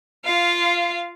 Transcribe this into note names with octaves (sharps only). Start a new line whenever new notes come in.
F4 F5